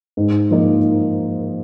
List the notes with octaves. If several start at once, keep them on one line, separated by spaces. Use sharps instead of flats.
G#2
F3 A#3 D#4